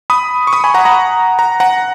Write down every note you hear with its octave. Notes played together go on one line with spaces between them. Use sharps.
B5 D#6
C#6
B5 D#6
G#5 B5
F#5 A#5
F#5 A#5
F#5 A#5
F#5 A#5